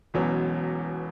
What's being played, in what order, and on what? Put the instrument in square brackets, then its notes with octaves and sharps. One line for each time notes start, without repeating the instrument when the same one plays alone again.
[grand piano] E1 E2 B2 F#3 C#4